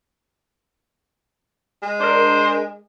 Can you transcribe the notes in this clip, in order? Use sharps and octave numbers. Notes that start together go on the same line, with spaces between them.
G#3
D4 A#4 C5